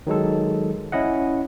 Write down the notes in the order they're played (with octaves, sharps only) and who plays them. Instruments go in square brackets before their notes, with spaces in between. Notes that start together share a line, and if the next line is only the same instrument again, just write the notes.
[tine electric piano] D#3 F#3 G#3 A4
C#4 E4 D#5 F#5